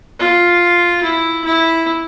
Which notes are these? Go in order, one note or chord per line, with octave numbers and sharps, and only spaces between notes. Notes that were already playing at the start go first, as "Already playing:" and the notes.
F4
E4
E4